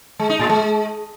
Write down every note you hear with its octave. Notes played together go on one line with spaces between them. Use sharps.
G#3
D#4
A2
G#3